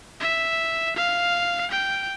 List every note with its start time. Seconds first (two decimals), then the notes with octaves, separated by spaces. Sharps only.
0.20 E5
0.96 F5
1.71 G5